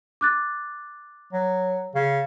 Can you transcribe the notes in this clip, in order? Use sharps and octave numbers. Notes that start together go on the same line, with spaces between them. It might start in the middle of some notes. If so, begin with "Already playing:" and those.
D6 F#6 A6
F#3
C#3